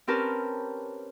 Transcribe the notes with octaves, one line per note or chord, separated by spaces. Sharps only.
C4 C#4 G4 A#4 B4 A5